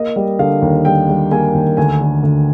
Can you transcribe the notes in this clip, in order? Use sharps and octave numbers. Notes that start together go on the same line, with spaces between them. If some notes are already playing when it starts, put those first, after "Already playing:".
Already playing: A#3 D#5
G3
D3 F5
D#2
G3 G5
G3
A#3 G#5
D#2
D2 G#5
D3
D2